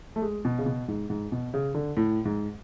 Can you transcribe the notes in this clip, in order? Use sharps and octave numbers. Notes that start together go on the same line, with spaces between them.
A3
G#3
B2
C#3
B2
G#2
G#2
B2
C#3
D3
A2
G#2